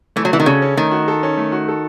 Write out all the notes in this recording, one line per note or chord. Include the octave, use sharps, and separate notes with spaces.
E3 A3
F#3
E3 F#4
D#3
C#3 A4
C#4
D#3 A3
F#4
A4
C#4
A3
F#4
A4